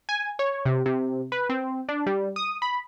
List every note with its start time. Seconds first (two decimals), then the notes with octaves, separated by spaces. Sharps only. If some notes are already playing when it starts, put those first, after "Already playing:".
0.09 G#5
0.39 C#5
0.65 C3
0.86 C3
1.32 B4
1.49 C4
1.89 D4
2.06 G3
2.36 D#6
2.62 B5